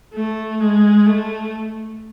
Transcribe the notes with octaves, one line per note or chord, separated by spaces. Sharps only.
A3
G#3
A3